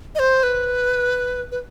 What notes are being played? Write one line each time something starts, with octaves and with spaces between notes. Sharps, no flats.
D#5
C5
B4
B4